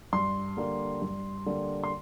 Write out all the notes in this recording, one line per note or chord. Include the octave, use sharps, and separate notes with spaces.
G2 C6
D3 G3 A#3
G2
D3 G3 A#3
C6